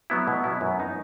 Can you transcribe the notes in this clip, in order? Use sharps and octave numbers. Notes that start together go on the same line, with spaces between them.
F#3 B3 E4
B2
F#3 B3 E4
F#2
E3 B3 D#4 A#4